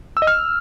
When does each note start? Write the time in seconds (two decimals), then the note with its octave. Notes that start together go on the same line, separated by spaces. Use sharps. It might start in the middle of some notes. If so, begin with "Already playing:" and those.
0.17 E6
0.22 D#5
0.27 F6